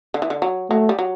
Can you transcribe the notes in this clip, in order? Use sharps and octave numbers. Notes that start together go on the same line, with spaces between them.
D3
E3
D3
F#3
F#3 A3
G3
F#3